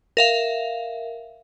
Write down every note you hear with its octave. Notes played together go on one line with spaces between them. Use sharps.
A#4 E5 F5